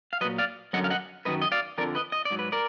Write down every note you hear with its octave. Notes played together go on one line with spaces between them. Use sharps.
F5
A#2 F#3 B4 D#5
D5 F5
F#2 D3 F#3 D#5 F#5
F5
D#5 F#5
F#2 D#3 F#3 B4 D#5
D#5
D5 F5
F2 D3 F3 A#4 D5
B4 D#5
D#5
D5
G#2 F#3
B4
A#4 D5